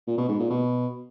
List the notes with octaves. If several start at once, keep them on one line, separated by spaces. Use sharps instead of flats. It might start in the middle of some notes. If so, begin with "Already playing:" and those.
A#2
B2
G#2
A#2
B2